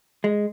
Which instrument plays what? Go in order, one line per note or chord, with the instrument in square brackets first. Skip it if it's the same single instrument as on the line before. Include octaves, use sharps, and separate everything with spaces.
[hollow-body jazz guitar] G#3